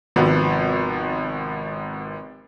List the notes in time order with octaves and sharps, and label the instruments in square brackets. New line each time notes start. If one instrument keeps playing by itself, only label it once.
[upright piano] G#1 [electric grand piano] C3 F3 B3